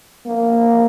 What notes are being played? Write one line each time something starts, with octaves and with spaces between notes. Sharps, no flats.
A#3